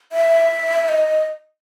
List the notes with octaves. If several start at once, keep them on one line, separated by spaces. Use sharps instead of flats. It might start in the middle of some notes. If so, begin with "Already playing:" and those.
E5
D#5